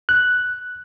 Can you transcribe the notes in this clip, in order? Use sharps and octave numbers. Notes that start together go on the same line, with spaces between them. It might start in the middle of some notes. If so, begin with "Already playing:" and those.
F#6